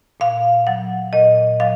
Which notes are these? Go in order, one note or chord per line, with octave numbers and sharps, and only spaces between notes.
A#2 F5
F#3 F#5
A#2 D#5
F#3 F5